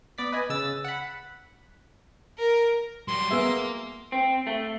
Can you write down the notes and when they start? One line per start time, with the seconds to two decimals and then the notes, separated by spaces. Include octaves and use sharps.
0.18 B3 D5 B6
0.32 B4 D#5 G#5
0.50 C#3 E6 A6
0.85 F#5 B5
2.38 A#4
3.08 F#3 G3 C6
3.31 A#3 B3 G#4 E5
4.12 C4
4.47 A3